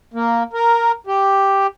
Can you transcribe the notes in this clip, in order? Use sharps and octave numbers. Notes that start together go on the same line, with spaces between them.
A#3
A#4
G4